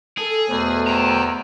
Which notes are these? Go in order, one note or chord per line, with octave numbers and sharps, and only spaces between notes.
G#4 A4
E2 B2 A3 C5
G5 A#5